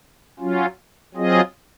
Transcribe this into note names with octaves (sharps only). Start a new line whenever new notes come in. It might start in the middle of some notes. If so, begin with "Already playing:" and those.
F#3 C#4 F4
F#3 C4 F4 G#4 D#5